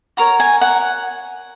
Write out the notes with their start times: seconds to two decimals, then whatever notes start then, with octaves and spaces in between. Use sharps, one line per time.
0.17 F#4 A#4 C#5 A#5
0.40 G#5
0.61 F#5